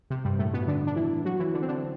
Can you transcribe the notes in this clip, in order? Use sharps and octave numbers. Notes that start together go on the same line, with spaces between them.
C3
G2 G3
A2 A3
B2 B3
D3 D4
D4
E3 E4
F#3 F#4
E3 E4
D3 D4
C4
D3 D4